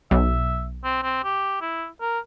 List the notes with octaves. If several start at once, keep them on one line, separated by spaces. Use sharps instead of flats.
B1 E5
C4
C4
G4
E4
A#4